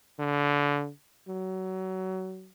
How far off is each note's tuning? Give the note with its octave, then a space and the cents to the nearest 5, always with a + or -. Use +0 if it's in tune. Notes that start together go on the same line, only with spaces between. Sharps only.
D3 -25
F#3 +25